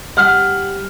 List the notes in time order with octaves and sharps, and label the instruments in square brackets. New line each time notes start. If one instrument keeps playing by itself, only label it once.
[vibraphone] G3 G4 [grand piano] F#5 F6